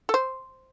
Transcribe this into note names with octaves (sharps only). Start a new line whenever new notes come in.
A4
C5